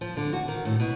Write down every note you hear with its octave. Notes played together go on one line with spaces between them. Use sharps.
F3
D3
F#4
D#3
A2
B2